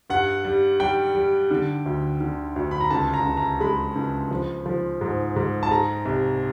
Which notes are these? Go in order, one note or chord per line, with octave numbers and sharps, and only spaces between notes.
G2 F#5
G3
G3 G5
G3
D3
D2
D3
D2
B5
A#5
C#2 A5
A#5
C#2
A#5
G#3 B5
C#2
F3
F3
G#2
G#2
A5
G#3 A#5
C2